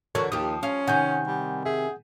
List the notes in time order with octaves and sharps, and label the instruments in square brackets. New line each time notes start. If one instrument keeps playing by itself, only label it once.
[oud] D3 E3 F#4 [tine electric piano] A4 A#4 C#5
[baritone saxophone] D#2 [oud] F3 G4 [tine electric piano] D#6
[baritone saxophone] C#4 [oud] F4
[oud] C3 D#3 [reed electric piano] F#5 G#5 G6
[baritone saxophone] G3
[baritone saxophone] G#4 [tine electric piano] E5